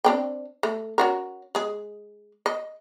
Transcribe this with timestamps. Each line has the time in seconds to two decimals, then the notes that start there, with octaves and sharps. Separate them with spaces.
0.04 C4 D4 G5
0.63 A3
0.98 C#4 F#4 A#4
1.55 G#3 G#4
2.46 D#5